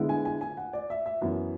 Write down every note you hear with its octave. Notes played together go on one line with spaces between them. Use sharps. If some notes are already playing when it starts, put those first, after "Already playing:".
Already playing: D3 G#3 B3 E4
G#5
G#5
G#5
F#5
D5
E5
E5
F#2 E3 B3